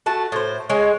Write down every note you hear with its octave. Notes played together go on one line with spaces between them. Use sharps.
A3 F#4 A5
A2 C5
G#3 C#5